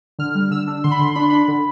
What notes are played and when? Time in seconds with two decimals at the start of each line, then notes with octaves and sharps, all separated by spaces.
0.19 D3 F6
0.35 G3
0.51 D3 E6
0.67 D4
0.84 D3 C6
0.91 B5
0.99 D3 C6
1.15 D4 B5
1.23 C6
1.30 D4 B5
1.48 D3